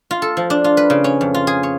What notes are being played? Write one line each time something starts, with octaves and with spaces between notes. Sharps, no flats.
F4
A4
F3
D4
F4
B4
C#3
C#4
F2
F4
G#4
C#5